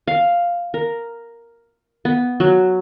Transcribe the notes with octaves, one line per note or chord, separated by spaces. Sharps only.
F5
A#4
B3
F#3